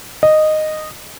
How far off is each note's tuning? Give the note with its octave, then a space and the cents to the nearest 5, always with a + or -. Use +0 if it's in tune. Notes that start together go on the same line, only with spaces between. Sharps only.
D#5 -10